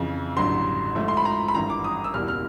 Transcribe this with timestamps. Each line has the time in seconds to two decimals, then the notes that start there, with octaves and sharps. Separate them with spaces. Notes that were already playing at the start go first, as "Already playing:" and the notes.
Already playing: F2 C#3 E3
0.36 A1 G2 D3 F#3 C6
0.95 G#2 F3 A3
1.08 C6
1.17 B5
1.25 A#5
1.48 B5
1.54 G#1 G2 E3 A#5
1.70 D6
1.84 D#6
2.04 E6
2.14 F#1 E2 B2 G3 A#3 F6
2.28 F6